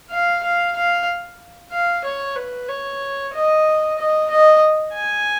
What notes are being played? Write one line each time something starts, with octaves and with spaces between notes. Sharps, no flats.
F5
F5
F5
F5
C#5
B4
C#5
D#5
D#5
D#5
G#5